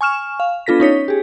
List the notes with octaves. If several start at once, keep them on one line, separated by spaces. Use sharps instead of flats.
G#5 C#6 F6 E7
F5
B3 D4 F4 A4 A#6 B6
C#4 D#4 C#5 B6
G4 G#4